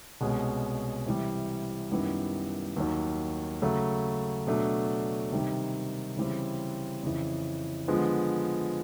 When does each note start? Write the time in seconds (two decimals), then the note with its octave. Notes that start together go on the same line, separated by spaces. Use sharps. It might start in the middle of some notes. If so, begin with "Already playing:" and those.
0.21 C2 B2 G#3 C#4
1.06 C3 E3 G3
1.91 F#2 D#3 G3 B3 E4
2.76 D#2 D#3 F#3
3.62 C#3 F#3 A3
4.47 B2 F#3 A3 D4
5.32 C3 D#3 G3
6.17 C#3 E3 G3 C4
7.03 F2 C#3 E3
7.88 D3 F3 G#3 B3